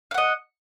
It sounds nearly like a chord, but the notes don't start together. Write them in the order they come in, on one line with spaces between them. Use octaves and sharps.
F5 F#5 D#5